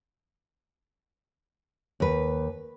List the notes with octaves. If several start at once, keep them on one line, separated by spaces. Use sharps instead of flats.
D#2 B4